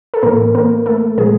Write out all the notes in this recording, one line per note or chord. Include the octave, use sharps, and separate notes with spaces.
A4
A2 E3 A#3 A#4
A#3 A#4
A3 A4
A#2 F3 G#3 G#4